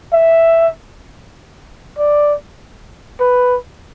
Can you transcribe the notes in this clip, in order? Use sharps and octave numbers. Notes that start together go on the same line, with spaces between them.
E5
D5
B4